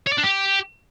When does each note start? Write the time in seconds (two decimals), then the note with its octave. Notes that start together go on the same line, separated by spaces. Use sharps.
0.06 C#5
0.12 D5
0.18 D4
0.23 G4